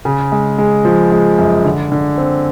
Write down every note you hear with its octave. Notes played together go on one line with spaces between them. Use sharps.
C#3
G#3
G#3
F3
G#3
F#2
D3
D3
C4